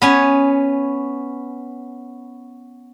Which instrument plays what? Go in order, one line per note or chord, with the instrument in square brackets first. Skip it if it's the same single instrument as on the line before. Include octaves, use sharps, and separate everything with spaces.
[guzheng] B3 C#4 G#5